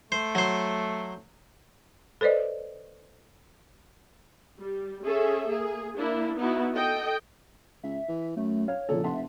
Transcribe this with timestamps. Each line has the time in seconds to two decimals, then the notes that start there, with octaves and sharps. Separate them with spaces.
0.12 A3 C5
0.35 F#3 C5
2.21 A4 B4 C5 D5 D#5
4.59 G3
5.03 C#4 G#4 A4 E5
5.48 A#3 G#4
5.96 A#3 D4 E4
6.37 B3 D#4 E4 F#4
6.73 A4 D#5 G5
7.83 C#2 E5
8.08 E3
8.36 F#2 A3
8.68 C#5 F5
8.89 A#1 A#2 C#3 A4
9.04 F1 E5 F#5 A5 C6